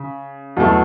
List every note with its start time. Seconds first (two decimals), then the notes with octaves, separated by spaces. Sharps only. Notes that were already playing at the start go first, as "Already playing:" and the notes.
Already playing: C#3
0.57 E2 B2 F#3 A3